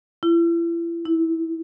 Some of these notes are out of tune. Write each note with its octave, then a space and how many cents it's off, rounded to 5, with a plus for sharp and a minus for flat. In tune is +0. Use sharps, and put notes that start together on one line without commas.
E4 +35
E4 -15